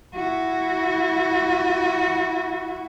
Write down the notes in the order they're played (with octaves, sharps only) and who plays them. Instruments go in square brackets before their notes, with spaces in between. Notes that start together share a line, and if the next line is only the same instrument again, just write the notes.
[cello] E4 F#4